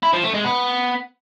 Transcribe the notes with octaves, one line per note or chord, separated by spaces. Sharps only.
E4
F3
A3
G#3
B3